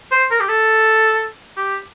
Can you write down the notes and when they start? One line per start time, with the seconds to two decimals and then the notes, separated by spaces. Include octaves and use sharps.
0.12 C5
0.31 A#4
0.40 G4
0.49 A4
1.57 G4